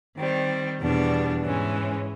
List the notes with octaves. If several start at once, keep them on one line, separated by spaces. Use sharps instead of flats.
D#3 G3 C4
E2 B2 G3 B3 D4
G#2 E3 G#3 C#4